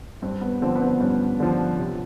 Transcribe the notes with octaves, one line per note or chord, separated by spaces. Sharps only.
G2 C4
B3
D3 F3 C4
B3
C4
G2 C#4
D3 F3
C3